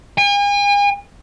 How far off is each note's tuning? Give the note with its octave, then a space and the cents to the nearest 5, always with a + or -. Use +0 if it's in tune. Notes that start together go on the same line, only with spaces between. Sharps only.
G#5 -40